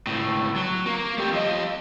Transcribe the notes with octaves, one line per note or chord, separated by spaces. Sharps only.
C#2 A2
F#3
A#3
A3 G4
F3 D#5